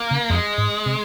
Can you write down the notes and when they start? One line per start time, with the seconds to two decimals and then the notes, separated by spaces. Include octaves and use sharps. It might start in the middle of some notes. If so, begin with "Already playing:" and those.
Already playing: A#3
0.11 C#3
0.30 F2 G#3
0.58 G#2
0.86 C3